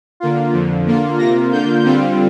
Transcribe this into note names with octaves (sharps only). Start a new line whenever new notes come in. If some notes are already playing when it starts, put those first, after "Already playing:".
D3 A#3 F4
F2 D3 F3
D3 A#3 F4
C3 A#3 F4 A#6
D3 A#3 F4 G6
D3 G3 C4 F4 G6